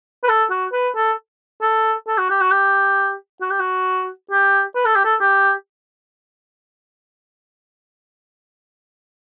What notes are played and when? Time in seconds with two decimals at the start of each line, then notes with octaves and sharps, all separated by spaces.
0.24 B4
0.29 A4
0.50 F#4
0.73 B4
0.96 A4
1.62 A4
2.08 A4
2.18 F#4
2.30 G4
2.41 F#4
2.51 G4
3.41 F#4
3.50 G4
3.60 F#4
4.31 G4
4.76 B4
4.85 A4
4.95 G4
5.05 A4
5.20 G4